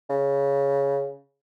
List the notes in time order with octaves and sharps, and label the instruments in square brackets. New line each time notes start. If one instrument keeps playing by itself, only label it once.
[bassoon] C#3